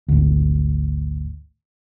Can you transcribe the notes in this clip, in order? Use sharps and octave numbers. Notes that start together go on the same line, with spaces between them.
G#1 D2